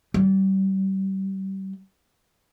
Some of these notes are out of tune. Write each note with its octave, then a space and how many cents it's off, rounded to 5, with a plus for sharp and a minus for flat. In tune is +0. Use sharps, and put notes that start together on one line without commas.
G3 -30